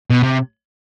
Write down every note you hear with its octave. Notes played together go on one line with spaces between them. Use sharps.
B2
C3